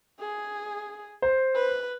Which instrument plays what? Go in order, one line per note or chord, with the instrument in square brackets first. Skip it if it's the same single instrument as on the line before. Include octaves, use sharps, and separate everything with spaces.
[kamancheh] G#4
[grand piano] C5
[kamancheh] B4